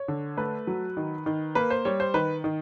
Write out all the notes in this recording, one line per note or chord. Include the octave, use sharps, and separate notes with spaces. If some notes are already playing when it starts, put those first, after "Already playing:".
Already playing: C#5
D3
A3 B4
F#3
D#3
D#3
A#3 B4
C5
G3 C#5
C5
D#3 B4
D#3